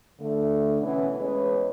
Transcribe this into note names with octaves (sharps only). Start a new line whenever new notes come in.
D3 A3
B2 E3 C#4
E2 G#3 C#4 B4 C#5 D#5